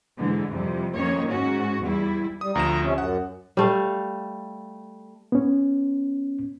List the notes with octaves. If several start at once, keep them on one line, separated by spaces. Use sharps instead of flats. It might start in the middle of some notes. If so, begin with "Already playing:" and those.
G#2 D3 E3 G#3
F2 C3 G3
F2 D#3 A#3 C#4 C#5
G#2 C#4 F#4
E2 G3 E4
G3 D#6
D2 F3 A#5 E7
C3 C#4
F#2 F#5
G3 A3 F5
B3 C#4